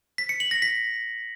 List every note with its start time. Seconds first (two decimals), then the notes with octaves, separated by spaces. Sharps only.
0.18 B6
0.29 C#7
0.40 F#7
0.51 A#6
0.62 B6